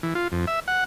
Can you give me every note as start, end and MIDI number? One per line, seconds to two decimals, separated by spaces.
0.03 0.14 52
0.15 0.28 65
0.32 0.45 41
0.47 0.60 76
0.68 0.84 78